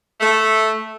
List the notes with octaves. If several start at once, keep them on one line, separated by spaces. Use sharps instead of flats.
A3